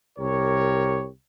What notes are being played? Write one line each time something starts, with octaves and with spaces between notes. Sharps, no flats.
C2 G4 A#4 C#5